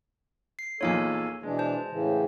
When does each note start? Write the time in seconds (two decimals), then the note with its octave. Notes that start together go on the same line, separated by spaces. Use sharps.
0.59 C7
0.81 E2 A#2 D#4 A4 C#5 F5 G#5
1.43 B2 E3 G#3 D4
1.59 C5 A5
1.91 A2 C#3 E3